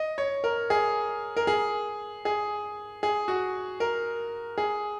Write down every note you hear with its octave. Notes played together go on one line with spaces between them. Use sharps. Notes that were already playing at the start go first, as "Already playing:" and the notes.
Already playing: D#5
C#5
A#4
G#4
A#4
G#4
G#4
G#4
F#4
A#4
G#4